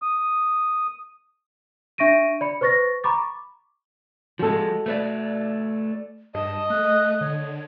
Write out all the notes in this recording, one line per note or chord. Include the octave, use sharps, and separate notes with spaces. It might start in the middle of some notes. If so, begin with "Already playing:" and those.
D#6
D4 E5 C#6 A#6 D7 D#7
D5 B5 C#7
B4 C5 C#6 A6 A#6
A#5 B5 C#6 D6 A6
F3 G#3 F#4 A4
A3 B4 D5
G2 D#5 A5
A3 F#6
D3 C#5